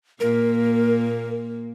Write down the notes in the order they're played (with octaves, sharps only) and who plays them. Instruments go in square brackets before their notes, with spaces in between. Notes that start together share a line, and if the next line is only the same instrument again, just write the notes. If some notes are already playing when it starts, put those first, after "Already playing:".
[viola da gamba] A#2 A#3 [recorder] A#4